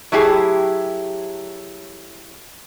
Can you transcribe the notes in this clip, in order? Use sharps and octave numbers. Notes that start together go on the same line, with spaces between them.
F#3 A3 E4 G4 G#4